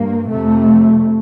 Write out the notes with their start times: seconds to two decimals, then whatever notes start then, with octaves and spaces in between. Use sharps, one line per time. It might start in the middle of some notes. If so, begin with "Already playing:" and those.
Already playing: G2 A#3
0.28 F2 C3 A3